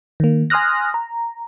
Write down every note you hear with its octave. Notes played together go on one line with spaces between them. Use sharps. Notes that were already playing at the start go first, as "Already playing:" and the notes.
D#3 A#3
G#5 C6 D#6 F6 F#6 A#6
A#5